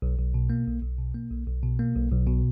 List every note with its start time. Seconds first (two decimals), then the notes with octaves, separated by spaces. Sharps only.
0.02 B1
0.19 B1
0.34 B2
0.50 A#3
0.67 B1
0.82 B1
0.98 B2
1.14 A#3
1.30 B1
1.47 B1
1.63 B2
1.79 A#3
1.96 B1
2.11 B1
2.27 B2